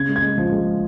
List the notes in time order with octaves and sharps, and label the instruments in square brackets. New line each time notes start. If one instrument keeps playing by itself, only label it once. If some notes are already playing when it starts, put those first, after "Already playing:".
Already playing: [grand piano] C#3 G#6
G#3
G#6
G#3
F3
G#3